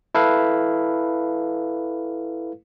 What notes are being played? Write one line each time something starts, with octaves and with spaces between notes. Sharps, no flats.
E4 A4 B4 F5